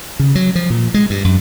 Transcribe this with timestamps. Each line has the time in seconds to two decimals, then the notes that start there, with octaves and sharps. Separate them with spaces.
0.19 C#3
0.35 F#3
0.55 F3
0.70 A#2
0.94 G#3
1.10 G2
1.24 F#2